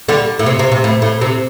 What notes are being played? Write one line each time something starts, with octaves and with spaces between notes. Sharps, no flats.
D3 G3
A2
C3
C3
C3
A2
A2
C3